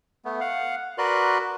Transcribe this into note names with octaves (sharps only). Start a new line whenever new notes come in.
A3 B3
F5 F#5
F#4 A#4 B4 D5 C6 F#6